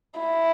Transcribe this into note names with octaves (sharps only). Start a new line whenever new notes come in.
E4